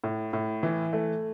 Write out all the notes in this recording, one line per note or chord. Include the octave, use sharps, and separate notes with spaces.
A2
A2
E3
A3